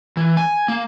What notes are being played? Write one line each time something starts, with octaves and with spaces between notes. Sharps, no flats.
E3
G#5
A#3